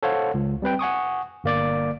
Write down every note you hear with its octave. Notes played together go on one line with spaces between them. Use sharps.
A4 C5 C#5 F5 F#5
C#2
G3 C4 B4 G5
F#5 G#5 C#6 D#6
G1 A#3 D5 D6